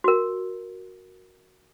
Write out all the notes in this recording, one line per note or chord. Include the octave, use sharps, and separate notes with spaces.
F#4 A#4